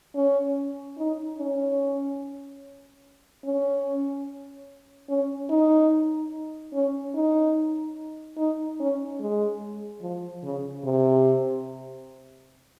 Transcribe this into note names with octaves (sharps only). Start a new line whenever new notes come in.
C#4
D#4
C#4
C#4
C#4
D#4
C#4
D#4
D#4
C#4
G#3
F3
C#3
C3